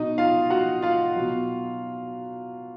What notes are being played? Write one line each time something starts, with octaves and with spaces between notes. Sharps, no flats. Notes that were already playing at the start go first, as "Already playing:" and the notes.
Already playing: B2 F#3 D#4 D#5
F4 F5
F#4 F#5
F4 F5
B2 F#3